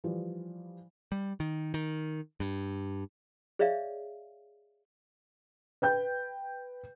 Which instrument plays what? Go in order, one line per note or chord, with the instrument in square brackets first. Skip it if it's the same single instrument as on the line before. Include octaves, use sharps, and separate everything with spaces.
[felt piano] E3 F3 G3
[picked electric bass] G3
D#3
D#3
G2
[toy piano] G#4 C#5 D5 E5 F5
[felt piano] B4 G5 G6